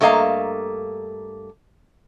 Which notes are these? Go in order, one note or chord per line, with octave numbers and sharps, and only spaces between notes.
G2 A3 A#3 D#5 F5 A#5